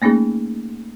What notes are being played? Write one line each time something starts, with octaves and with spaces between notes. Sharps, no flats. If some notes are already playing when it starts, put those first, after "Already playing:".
A3 A#3 C#4 D#4 G#4